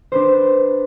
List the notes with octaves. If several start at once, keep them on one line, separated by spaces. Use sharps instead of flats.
D4 B4 C5